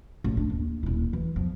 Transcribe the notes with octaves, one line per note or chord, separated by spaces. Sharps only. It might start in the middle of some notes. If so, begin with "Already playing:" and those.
A1
D4
D#2
D#1 E4
E3
E2 F3